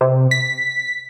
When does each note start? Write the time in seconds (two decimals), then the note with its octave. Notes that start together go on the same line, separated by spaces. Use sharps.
0.01 C3
0.31 B6